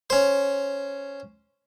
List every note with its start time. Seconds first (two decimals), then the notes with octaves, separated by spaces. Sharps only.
0.10 C#4 C5